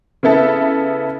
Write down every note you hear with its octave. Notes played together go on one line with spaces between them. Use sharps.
C#3 B3 E4 A4